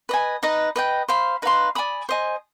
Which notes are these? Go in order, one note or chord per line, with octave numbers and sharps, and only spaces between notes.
B4 D#5 G#5
D#4 B4 D#5
B4 D#5 G5
C5 F5 B5
D#4 B4 F5 C6
D5 G#5 B5 D#6
C5 D#5 G#5